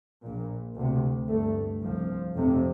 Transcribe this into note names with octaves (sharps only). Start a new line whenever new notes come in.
A#1 A#2
D2 C3
G1 G2 A3
C2 C3 F3
F1 F2 C3